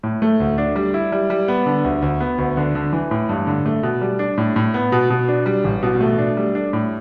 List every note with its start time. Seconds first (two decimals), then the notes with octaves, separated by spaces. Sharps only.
0.03 A2
0.22 A3
0.40 D2
0.58 D4
0.76 G3
0.94 E4
1.12 G3
1.30 G3
1.48 B3
1.66 D3
1.84 D2
2.02 D2
2.20 B3
2.38 D2
2.57 D3
2.75 D3
2.93 E3
3.11 A2
3.29 G2
3.47 D3
3.66 A3
3.83 B2
4.01 G3
4.19 D4
4.38 A2
4.56 A2
4.74 B3
4.92 B2
5.10 B2
5.28 D4
5.46 G3
5.64 A1
5.83 B2
6.01 A3
6.18 D4
6.37 G3
6.55 D4
6.73 A2